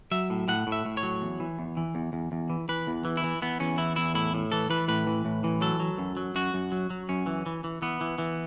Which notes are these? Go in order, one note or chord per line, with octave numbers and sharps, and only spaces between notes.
F#3 E5
A2
A2 F#5
A2
E5
A2
C#5
F#3
E2
E3
E2
E3
E2
E2
E2
E3
E3 B4
E2
E3
E4
E3
E3 B3
E2 C#4
E3 E4
E2 E4
A2 E4
A2
E3 A4
E3 B4
A2 B4
E3
A2
E3
F#3 A4
F#3
F#2
F#3
F#2 F#4
F#2
F#3
F#3
F#2 C#4
E3
E3
E3
E3 B3
E3
E3